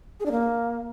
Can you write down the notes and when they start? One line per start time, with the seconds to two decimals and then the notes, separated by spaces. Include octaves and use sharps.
0.20 G#4
0.26 D4
0.31 A#3